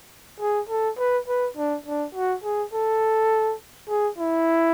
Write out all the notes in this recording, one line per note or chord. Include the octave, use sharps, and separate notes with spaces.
G#4
A4
B4
B4
D4
D4
F#4
G#4
A4
G#4
E4